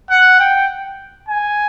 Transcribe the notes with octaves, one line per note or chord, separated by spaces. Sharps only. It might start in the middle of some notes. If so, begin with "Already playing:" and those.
F#5
G5
G#5